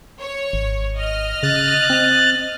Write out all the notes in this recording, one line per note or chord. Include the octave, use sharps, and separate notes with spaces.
C#5
G#1
D#5 F6
C#3 F#6 A6
C4